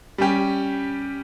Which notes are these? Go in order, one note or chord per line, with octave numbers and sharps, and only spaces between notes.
G3 C#4 G4